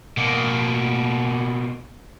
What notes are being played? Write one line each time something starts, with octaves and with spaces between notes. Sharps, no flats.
B2 A#3